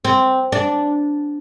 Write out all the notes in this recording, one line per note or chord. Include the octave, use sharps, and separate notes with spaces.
C4
D4